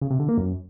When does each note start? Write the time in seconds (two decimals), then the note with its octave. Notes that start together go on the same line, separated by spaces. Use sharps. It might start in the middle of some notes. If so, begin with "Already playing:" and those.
0.01 C#3
0.11 C3
0.20 D3
0.29 A#3
0.38 F#2